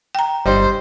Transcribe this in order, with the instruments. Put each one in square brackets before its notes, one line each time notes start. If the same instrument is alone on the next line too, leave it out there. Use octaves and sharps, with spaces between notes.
[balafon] G5 A#5
[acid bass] G1 [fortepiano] G3 D#5 [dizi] C5